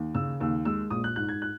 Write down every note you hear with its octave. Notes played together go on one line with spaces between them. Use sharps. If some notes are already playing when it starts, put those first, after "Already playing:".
Already playing: D#2
C#3 E6
D#2 E6
G#3 E6
A#1 D#6
F#6
G#2 F#6
G#6
F#6